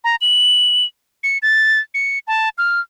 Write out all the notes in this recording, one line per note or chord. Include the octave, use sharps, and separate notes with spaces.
A#5
F#7
C#7
A6
C#7
A5
F6